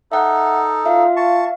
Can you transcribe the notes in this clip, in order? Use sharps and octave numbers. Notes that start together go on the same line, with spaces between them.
D#4 A4 E5 F#5
F4 E5 F5
A5 C#6